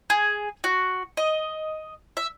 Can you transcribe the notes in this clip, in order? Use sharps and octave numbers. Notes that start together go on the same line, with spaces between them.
G#4
F#4
D#5
E5